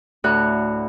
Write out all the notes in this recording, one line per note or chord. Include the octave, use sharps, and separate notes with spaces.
D2 A2 F#4 F#6